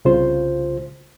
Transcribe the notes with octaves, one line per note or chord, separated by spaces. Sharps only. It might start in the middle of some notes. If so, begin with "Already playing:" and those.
C2 C#3 F4 C5